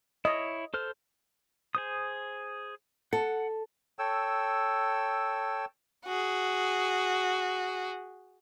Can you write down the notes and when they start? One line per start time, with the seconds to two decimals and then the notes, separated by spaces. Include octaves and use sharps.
0.25 E4 C#5 D#5
0.74 A4 C5 F6
1.75 G#4 C5 D#6
3.13 A4 F#5
3.99 A4 C#5 G5 E6
6.06 F#4 G#4